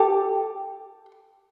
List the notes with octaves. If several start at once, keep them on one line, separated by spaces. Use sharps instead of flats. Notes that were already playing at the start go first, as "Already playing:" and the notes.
Already playing: G4 A4